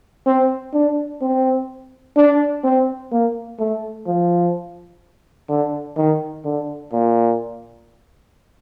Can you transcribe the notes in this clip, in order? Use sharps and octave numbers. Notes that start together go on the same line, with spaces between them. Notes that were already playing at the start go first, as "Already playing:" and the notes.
C4
D4
C4
D4
C4
A#3
A3
F3
D3
D#3
D3
A#2